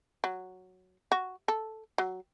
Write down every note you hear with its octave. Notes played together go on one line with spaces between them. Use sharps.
F#3
F#4
A4
F#3